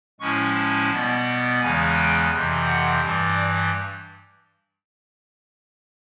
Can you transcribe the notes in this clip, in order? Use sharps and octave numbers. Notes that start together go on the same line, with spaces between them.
A2 F3 G#3 C#4 E4 C#6
A5
B2 G3 B3
E2 C#3 E3 G#3 G#5
G5
F2 C3 E3
F#5
G2 E3 G3
D5